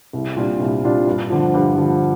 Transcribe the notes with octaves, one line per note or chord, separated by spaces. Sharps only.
C2
A#2 G3 D4 F4
C2
A#2 G3 D4 F4
G2
D3 F3
G2
D3 F3